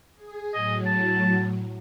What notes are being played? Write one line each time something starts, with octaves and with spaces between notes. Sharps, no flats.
G#4
A2 F#3 D#5
A5